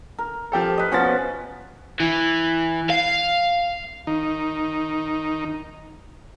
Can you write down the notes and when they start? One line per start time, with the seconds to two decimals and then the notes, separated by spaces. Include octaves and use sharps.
0.18 A#4
0.52 F3 G4 A4
0.78 B4 D#5
0.92 B2 F3 C#4 F#5 A6
2.00 E3
2.90 F5
4.07 D#3 D#4